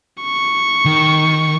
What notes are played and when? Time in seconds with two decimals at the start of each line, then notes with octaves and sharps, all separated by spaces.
0.23 C#6
0.85 D#3